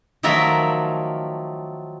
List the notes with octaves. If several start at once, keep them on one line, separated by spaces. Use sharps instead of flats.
D#3 F3 F#3 A3 A#4 E5